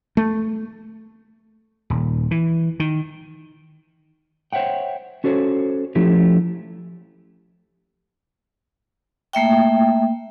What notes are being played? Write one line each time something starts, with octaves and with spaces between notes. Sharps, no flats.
A3
D#1
E3
D#3
C5 C#5 E5 F#5 G5
C#4 F#4 A4 C5 C#5
F3 A3 C#4 E4 G4
A3 A#3 E5 G5